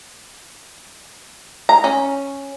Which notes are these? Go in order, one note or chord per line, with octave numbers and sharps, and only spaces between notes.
A#5
C#4